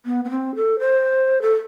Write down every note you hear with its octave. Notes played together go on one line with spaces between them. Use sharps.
B3
B3
C4
A4
C5
A4